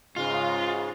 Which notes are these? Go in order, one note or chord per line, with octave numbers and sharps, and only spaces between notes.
G#2 C#3 G#3 F4